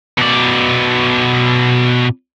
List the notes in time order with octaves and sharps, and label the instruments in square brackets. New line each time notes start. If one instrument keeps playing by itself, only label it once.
[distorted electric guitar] B2 D5